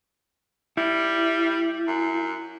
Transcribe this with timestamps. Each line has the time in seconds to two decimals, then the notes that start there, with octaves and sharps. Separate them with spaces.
0.77 G3 E4
1.88 F#2